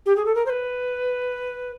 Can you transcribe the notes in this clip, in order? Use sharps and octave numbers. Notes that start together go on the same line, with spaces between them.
G4
G#4
A4
A#4
C5
B4